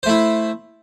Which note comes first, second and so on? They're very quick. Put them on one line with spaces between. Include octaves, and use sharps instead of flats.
C5 A3 E4